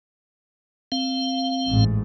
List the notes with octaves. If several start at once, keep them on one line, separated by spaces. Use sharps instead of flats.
C4 F5
A1 G#2